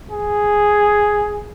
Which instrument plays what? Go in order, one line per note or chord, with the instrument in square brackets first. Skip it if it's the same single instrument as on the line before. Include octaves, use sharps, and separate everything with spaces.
[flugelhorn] G#4